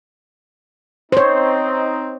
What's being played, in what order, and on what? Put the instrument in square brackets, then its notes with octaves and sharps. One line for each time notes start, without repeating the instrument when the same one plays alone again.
[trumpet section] C4 D#4 [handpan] C5 C#5